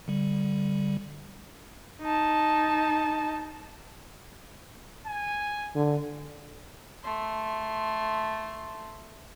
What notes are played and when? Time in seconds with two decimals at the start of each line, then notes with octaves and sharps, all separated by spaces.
0.08 D3 G3
2.02 D#4 A5
5.06 G#5
5.75 D3
7.03 A3 C6